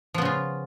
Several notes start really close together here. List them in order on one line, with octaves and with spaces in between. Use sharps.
F3 B3 C#3 F4